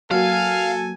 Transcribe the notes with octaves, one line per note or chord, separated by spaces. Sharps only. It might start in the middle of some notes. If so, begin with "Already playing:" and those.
F#3 A#3 F#4 A4 F5 G#5